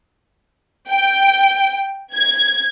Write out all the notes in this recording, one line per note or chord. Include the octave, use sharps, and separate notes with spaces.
G5
G#6